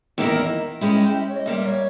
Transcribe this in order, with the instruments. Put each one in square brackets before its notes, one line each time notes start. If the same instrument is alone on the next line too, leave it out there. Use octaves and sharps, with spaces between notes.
[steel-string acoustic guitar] E2 D#3 A#3 E4 A#4 [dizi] D#5
[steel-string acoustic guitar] G#3 C#4 E4 G4 [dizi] E5
[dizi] E5
G5
E5
C#5
D#5
[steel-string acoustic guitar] A#2 G3 A#3 [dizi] E5
[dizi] E5
C#5